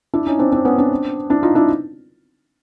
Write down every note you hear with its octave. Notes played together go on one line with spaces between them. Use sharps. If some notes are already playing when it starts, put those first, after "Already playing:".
D4 E4
C#4 D#4
C4 D4
C4 D4
B3 C#4
C4 D4
D4 E4
D#4 F4
D4 E4